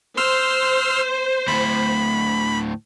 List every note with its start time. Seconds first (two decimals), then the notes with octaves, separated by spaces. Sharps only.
0.17 C5 C6 E6 F6
1.48 D2 A2 B5